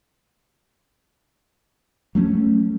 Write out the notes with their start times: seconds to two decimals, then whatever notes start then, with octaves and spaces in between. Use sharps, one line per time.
2.15 F#3 A3 C#4